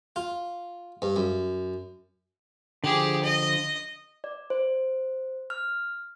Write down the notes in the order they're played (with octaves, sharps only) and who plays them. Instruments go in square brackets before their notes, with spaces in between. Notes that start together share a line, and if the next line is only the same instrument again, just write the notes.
[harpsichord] F4
G2
F#2
[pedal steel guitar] D3 F3 [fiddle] G4 G#4
[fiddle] D#5
[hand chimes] D5
C5
F6